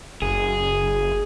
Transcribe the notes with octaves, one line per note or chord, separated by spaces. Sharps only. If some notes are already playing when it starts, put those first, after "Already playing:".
F#1 G#4